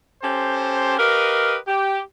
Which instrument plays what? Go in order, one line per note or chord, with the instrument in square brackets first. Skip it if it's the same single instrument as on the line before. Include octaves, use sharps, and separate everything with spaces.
[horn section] C#4 G4 A4 C5
G4 A#4 B4 D#5 F5
G4